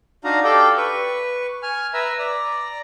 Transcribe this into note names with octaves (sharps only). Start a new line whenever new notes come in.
D4 D#4 F#4 D#5 F5 A#5
G4 A4 D5 F5 G5
B4 C#6
G#5 F6
B4 E5 A#5
D5 A#5